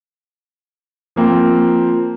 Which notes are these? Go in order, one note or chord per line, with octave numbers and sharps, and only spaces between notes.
F3 A#3 C4